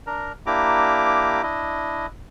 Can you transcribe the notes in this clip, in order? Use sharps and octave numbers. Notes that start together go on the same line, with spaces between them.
D4 A#4 A#5
A#3 D4 E4 G4 A#5 D6
D4 E4 D#5